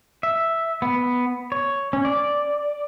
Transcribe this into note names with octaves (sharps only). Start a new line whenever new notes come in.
E5
B3
C#5
C#4
D5